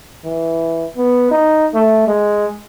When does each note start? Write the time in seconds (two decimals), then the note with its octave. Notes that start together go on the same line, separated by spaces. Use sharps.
0.25 E3
0.97 B3
1.31 D#4
1.74 A3
2.08 G#3